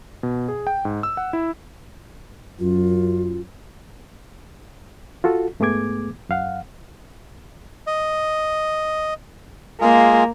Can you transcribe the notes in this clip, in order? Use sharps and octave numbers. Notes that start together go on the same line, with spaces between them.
B2
G#4
G5
G#2
E6
F#5
E4
F#2 F4
F4 F#4 A4
G#2 A3 B3 G#4 D6 G#6
F#2 F5 F#5
D#5
G#3 A#3 F4 G#4